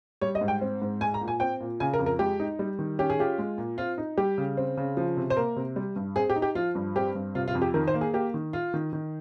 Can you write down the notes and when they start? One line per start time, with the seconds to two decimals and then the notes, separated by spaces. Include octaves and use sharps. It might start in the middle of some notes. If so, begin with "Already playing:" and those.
0.21 G3 C#5
0.35 D#5
0.41 G#2
0.48 G5
0.61 C4
0.82 G#2
1.01 G#3 G#5
1.14 A#5
1.21 A#2
1.28 G#5
1.40 C4 G5
1.60 A#2
1.80 C#3 G#5
1.94 A#4
1.99 F2
2.06 A#4
2.19 G#3 G4
2.40 D#4
2.59 G3
2.79 D#3
2.99 C#4 G4
3.10 G#4
3.19 F4 G4
3.38 G#3
3.58 A#2
3.78 C4 F4
3.98 D#4
4.17 G3 G4
4.38 C#3
4.57 C4
4.77 C#3
4.97 F3
5.17 C3
5.30 C5
5.37 A#3 A#4
5.56 C3
5.76 G3
5.96 G2
6.16 C4 G#4
6.30 G4
6.36 D#4
6.42 G4
6.55 F3 F4
6.75 G2
6.96 C4 G4
7.15 G2
7.35 C3 F4
7.48 F4
7.55 F2
7.62 G4
7.74 D#3 A#4
7.88 C5
7.94 A#3
8.01 G#4
8.14 A#3 G4
8.34 D#3
8.53 F4
8.74 D#3
8.93 D#3